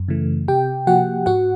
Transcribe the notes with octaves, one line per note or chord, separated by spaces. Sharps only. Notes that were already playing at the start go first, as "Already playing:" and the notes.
Already playing: F#2
C#3 E3 A3
C3 G4 G5
F3 A#3 F#4 F#5
G#2 F#4 F#5